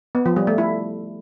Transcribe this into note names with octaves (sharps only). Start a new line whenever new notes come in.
B3
F3
G3
A3
E4